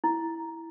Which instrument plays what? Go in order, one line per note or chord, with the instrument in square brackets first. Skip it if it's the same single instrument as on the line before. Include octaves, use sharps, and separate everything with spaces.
[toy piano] E4